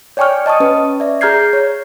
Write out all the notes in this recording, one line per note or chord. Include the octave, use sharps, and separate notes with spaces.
C#5 D5 G5 G#5 C#6 F6
D#5 A5 C#6 D#6
C#4 B4
D5 E5
G#4 A#5 F6 G6 G#6 C7
C#5